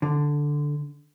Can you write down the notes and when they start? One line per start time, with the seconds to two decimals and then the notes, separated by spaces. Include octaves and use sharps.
0.02 D3